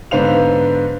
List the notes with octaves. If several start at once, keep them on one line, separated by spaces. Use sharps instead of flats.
G#2 D3 B3 C5 F5 F7